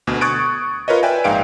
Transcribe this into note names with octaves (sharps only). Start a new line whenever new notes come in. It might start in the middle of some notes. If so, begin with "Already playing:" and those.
D2 B2
C#6 D#6 F#6 G#6 A6 D7
F4 A#4 B4 C#5 D#5
B4 D5 E5 G5 G#5
A#1 G#2 F5 G5 D7